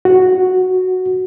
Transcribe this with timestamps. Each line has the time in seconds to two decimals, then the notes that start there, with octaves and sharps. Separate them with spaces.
0.05 F#4